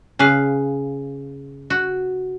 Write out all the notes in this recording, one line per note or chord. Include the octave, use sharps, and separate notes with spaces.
C#3 B4 F5
F#4